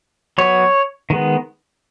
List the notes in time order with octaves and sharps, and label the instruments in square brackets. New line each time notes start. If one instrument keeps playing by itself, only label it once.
[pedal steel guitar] F#3 B3 C#5
D#3 G#3 B3